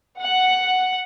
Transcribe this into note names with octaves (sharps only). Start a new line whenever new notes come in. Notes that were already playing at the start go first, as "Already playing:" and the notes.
F#5